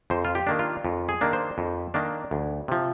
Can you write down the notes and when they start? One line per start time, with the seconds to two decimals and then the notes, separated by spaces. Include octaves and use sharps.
0.10 F2 C5
0.25 F4
0.35 G4
0.47 D#3 A#3 D4
0.59 F4
0.85 F2
1.09 G#4
1.21 D#3 A#3 D4
1.33 C5
1.58 F2
1.94 D#3 A#3 D4
2.31 D2
2.68 C3 F3